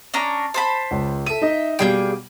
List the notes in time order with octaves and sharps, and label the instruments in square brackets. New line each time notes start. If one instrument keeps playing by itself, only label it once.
[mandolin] C#4 D4 A#5
C5 A5 B5
[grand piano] C#2
[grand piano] A4 D#7 [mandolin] E5
[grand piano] D#4 D#5
[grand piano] B2 G3 [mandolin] A#3 G#4 G5